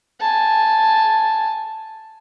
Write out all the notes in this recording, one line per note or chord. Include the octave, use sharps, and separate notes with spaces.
G#5 A5